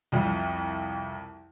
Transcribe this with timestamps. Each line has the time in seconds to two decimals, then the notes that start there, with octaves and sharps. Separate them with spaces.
0.12 C2 F2